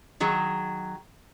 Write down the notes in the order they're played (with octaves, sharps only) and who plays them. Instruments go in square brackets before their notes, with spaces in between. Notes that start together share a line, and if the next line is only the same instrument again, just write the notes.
[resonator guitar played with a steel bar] D#3 F#3 G#4